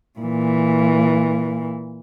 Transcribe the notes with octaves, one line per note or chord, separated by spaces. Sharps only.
A#2 E3